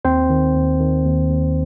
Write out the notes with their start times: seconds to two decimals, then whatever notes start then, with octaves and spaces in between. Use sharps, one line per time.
0.05 D#2 C4 C5
0.30 D#3
0.55 D#2
0.80 D#3
1.05 D#2
1.30 D#2